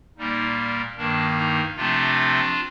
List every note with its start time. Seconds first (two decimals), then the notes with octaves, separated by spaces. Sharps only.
0.18 A#2 G3 A#3 D#4
0.97 G2 D#3 A#3 D4
1.37 D#4
1.76 C3 F3 A3 C4 D4 F4